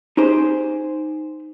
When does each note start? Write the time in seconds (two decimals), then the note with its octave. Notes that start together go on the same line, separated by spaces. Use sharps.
0.17 D#4 G4 G#4 C5